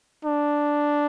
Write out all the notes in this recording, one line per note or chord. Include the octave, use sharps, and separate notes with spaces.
D4